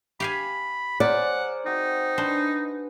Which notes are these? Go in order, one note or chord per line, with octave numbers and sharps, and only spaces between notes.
G4 F5 G#5 B5
G#4 A#4 C5 D5 F#5
C4 D#4 F#4
D4 B4 C5